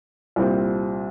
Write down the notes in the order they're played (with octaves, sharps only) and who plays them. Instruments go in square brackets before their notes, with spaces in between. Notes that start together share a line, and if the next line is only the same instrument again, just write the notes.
[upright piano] C2 A#2 G3 C4 F4